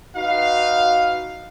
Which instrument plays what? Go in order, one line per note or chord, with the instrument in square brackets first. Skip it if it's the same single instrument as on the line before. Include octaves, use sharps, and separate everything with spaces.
[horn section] D#4 F#4 B4 F5